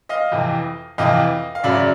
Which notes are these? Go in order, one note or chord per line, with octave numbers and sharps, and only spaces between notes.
D#5 F5
F2 C3 E3
F2 C3 E3 D#5 F5
F5
F#2 C#3 F#3 D5 E5